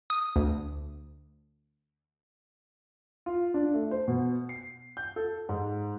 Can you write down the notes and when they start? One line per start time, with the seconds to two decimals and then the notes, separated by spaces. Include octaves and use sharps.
0.10 D#6
0.36 D2
3.26 F4
3.54 D4
3.74 A3
3.91 C5
4.08 B2
4.49 C7
4.97 G6
5.16 A4
5.49 G#2